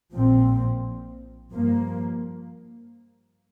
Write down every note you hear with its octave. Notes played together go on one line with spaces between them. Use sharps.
A#1 A#2 F3 C4
G2 F3 A#3